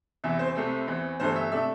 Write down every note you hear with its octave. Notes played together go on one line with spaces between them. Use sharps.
E2 C3 E3 E5
C5
C2 C3 A3 C4
E2 E3 C4
G1 G2 E3 A3 C5
E5
C3 A3 D4 E5